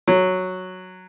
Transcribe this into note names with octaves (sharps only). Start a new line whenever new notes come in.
F#3